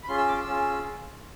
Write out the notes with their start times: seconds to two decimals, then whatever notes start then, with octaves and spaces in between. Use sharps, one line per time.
0.03 B5
0.08 C#4 F4 G#4 C6
0.18 E6
0.28 D6
0.38 E6
0.47 C#4 F4 G#4